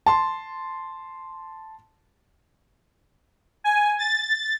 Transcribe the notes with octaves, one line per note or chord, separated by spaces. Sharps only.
A5 C6
G#5
A6